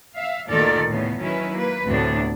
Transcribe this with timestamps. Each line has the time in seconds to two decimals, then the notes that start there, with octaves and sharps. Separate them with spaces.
0.14 E5 F5
0.49 D2 A#2 D#3 A4 A#4 D5
0.88 A2 C#3 B3
1.20 D#3 F#3 C#4 E4 B4
1.53 A#3 B4
1.85 D2 A2 C3 B3 D4